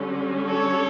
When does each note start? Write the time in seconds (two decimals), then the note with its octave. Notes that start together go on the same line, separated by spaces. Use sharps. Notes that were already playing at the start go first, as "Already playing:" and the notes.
Already playing: D3 G3 C#4
0.46 A4 C#5